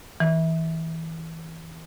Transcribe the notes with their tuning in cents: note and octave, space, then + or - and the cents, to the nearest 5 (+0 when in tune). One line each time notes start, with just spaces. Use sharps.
E3 -20